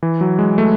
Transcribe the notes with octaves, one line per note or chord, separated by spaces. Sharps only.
E3
F#3
G#3
A3